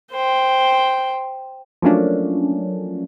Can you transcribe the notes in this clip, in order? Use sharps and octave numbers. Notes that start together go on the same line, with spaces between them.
C5 G5
F3 F#3 A3 A#3 C#4 D4